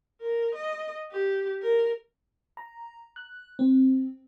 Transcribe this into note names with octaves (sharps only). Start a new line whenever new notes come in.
A#4
D#5
G4
A#4
A#5
F#6
C4